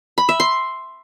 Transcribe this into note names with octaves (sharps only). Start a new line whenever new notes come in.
B5
E5
C6